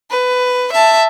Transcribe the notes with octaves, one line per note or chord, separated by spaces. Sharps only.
B4
E5 A5